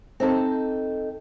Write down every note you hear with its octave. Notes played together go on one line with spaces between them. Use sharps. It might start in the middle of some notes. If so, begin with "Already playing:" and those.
C4 D#4 A4